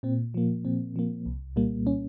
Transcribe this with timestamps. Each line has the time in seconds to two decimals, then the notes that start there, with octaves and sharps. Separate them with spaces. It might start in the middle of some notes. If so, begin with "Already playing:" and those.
0.03 A#2 C4
0.34 F3 A#3
0.65 A#2 C4
0.96 F3 A#3
1.26 C2
1.56 A#2 G3 A#3
1.87 C#4